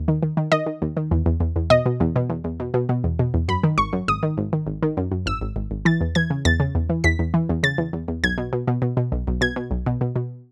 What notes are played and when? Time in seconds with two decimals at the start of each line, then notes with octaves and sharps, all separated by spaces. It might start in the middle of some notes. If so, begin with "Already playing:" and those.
Already playing: D#2
0.08 D#3
0.23 D#3
0.37 D#3
0.52 D#3 D#5
0.66 D#3
0.82 D#2
0.97 D#3
1.11 E2
1.26 E2
1.40 E2
1.56 E2
1.70 B2 D#5
1.86 B2
2.00 E2
2.16 B2
2.30 E2
2.44 E2
2.60 B2
2.74 B2
2.89 B2
3.04 E2
3.19 B2
3.34 E2
3.48 F#2 B5
3.64 D#3
3.78 G#1 C#6
3.93 F#2
4.08 G#1 D#6
4.23 D#3
4.37 G#1
4.53 D#3
4.67 G#1
4.83 D#3
4.97 F#2
5.12 F#2
5.26 G#1 E6
5.41 G#1
5.56 G#1
5.71 G#1
5.85 E3 A6
6.01 E2
6.15 E3 G#6
6.30 C#3
6.45 E2 A6
6.60 C#3
6.75 E2
6.89 E3
7.04 E2 B6
7.19 E2
7.34 E3
7.49 E2
7.63 C#3 A6
7.78 E2
7.93 E2
8.08 E2
8.24 B1 G#6
8.38 B2
8.53 B2
8.68 B2
8.82 B2
8.97 B2
9.12 B1
9.27 B1
9.41 B2 G#6
9.56 B2
9.71 B1
9.86 B2
10.01 B2
10.16 B2